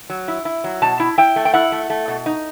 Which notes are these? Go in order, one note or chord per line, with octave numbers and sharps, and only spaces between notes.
F#3
E4
E4
F#3
B2 A5
E4
E4 G5
A3
G5
E4 F#5
A3
A3
B2
D#4